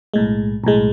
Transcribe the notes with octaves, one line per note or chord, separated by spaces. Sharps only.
B1 A2 G#3
B1 A2 G#3